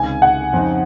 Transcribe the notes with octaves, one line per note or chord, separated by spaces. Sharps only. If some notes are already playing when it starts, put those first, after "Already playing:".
Already playing: C#2 C3 D#3 G#5
F#5
F2 C#3 F3 C4 D#4